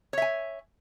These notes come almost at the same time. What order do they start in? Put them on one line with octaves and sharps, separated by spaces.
C#5 E5 G#5